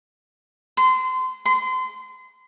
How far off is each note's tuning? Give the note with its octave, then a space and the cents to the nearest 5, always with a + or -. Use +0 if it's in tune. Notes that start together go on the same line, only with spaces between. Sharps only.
C6 -30
C6 -30